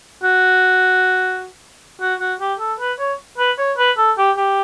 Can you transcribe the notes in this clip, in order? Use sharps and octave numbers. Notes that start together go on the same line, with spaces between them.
F#4
F#4
F#4
G4
A4
B4
C#5
B4
C#5
B4
A4
G4
G4